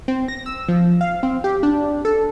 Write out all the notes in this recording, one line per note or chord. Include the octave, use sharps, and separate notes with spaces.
C4
A#6
E6
F3
F5
C4
G4
D4
A4